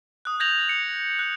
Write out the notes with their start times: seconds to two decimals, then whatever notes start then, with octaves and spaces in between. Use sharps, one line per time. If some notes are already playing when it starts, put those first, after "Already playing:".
0.25 D#6 F#6
0.40 G6 G#6 A#6 F7 F#7
0.69 C#7
1.19 F#6